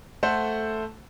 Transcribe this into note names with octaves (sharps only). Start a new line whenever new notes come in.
A3 A4 C5 F#5